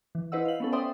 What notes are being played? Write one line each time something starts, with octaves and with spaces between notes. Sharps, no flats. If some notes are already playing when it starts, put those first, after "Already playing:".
E3
E4 B4 C5 D#5 F#5 E6
F5 F#7
B3 C#4 A4
C5 D5 E5 G5 C6 D#6